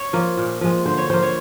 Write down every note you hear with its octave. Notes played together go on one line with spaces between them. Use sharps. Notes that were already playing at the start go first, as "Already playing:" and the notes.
Already playing: C#5
F3 A#3
A#2
F3 G#3
D3 C5
C#5
F3 A#3 C5
C#5